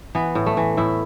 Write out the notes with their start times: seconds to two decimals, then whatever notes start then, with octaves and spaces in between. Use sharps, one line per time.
0.15 E3 B3
0.35 A2
0.46 A3
0.57 E3
0.77 A2 E4